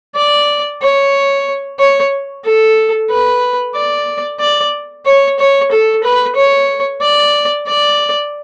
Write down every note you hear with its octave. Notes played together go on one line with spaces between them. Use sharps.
D5
C#5
C#5
A4
B4
D5
D5
C#5
C#5
A4
B4
C#5
D5
D5